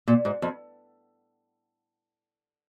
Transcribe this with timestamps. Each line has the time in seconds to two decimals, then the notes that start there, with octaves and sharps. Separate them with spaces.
0.07 A#2
0.25 G#2
0.42 F2